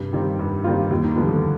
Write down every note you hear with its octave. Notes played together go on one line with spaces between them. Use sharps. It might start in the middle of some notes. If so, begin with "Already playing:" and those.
Already playing: G2 C3
D#3 G3 C4 F4
G2
D#3 G3 C4 F4
D#2 G3
D#3
D3 F3 G3 B3
D3